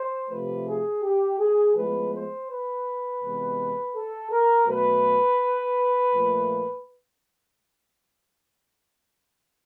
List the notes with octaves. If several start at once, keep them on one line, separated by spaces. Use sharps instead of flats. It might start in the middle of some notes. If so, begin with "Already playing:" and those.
Already playing: C5
C3 F3 A3 B4
G#4
G4
G#4
A2 F3 G#3 B3 B4
C5
B4
C3 E3 G#3 B3
A4
A#4
B2 F#3 A3 B4
A#2 F3 A3